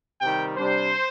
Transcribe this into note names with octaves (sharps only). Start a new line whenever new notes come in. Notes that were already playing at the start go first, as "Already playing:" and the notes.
C3 D#3 G3 G5
C3 G3 D4 C5